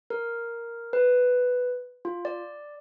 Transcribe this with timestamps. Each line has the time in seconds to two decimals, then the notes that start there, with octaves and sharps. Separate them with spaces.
0.10 A#4
0.93 B4
2.05 F4
2.25 D5